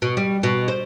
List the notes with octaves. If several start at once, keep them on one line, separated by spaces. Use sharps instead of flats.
B2
G3
B2
C5